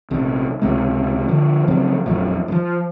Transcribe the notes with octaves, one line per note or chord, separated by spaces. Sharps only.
A#1 C3
C#2 C3 G#3
D3 F3
C#3 F3 F#3 C4
A#1 F2 F3 F#3
G2 F3